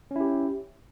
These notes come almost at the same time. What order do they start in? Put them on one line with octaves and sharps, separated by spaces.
C#4 E4 G4